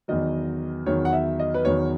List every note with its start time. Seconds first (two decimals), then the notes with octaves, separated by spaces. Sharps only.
0.08 E2 D#3 F#3 D#5
0.86 E2 D#3 F#3 C#5
1.05 F#5
1.13 E5
1.39 D#5
1.54 B4
1.65 E2 D#3 F#3 C#5